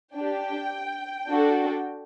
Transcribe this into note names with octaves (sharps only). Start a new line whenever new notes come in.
D4 G4 G5
D4 F#4 A4